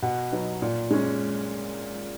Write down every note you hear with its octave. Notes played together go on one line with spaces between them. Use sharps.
B2 F#5
F#3 B3 D#4
A#2
G#3 C#4